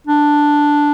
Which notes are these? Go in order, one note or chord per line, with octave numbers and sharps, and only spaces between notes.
D4